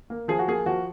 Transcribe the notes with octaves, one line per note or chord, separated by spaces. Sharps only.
A#3
F3 G#4
F#4
A#3 G#4
F3 F#4